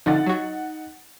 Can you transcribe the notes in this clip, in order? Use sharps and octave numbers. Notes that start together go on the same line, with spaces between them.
D3 F3 D#4 F#5 A6
F#3 F#4